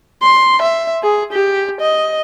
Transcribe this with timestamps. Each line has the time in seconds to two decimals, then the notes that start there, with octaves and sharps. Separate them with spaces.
0.23 C6
0.62 E5
1.03 G#4
1.33 G4
1.81 D#5